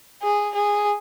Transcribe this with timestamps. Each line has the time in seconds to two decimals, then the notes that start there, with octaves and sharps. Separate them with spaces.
0.23 G#4
0.55 G#4